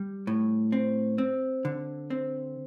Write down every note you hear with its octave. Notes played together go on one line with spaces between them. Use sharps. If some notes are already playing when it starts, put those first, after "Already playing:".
Already playing: G3
A2
C4
C4
D3
C4